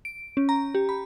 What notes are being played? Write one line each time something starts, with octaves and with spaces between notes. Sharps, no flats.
D7
C#4
A#5
G4
B5